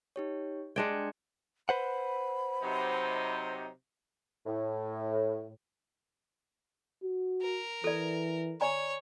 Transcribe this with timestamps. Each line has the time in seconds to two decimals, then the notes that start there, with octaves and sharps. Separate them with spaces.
0.16 D#4 G4 C#5
0.76 G#3 D4 G5 G#6 C#7
1.69 B4 C5 F#5 B5
2.62 C3 F#3 D#4
4.46 A2
7.03 F#4
7.42 A#4
7.84 E3 A4 D5
8.61 C#5 D5 G#5 A#5